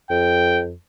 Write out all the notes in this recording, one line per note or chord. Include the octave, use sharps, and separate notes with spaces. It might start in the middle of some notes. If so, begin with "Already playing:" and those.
F2 G5